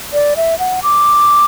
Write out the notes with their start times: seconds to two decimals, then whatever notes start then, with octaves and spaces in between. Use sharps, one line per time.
0.13 D5
0.37 E5
0.59 F#5
0.83 D6